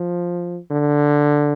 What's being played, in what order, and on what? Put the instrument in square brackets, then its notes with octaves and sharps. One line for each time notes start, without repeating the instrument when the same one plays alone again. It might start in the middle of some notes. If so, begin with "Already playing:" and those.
Already playing: [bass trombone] F3
D3